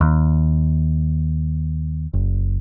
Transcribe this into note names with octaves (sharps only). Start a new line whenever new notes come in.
D#2
F#1